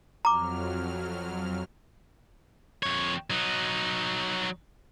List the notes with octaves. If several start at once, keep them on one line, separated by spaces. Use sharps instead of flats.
F2 F#3 A#5 D6 F6
F2 C#5
F#3 D#4